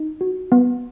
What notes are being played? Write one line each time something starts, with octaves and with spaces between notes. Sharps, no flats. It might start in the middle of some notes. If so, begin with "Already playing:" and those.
Already playing: D#4
F#4
B3